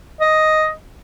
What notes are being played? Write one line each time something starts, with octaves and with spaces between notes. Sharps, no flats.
D#5